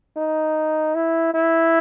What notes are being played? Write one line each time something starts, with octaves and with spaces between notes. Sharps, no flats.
D#4
E4
E4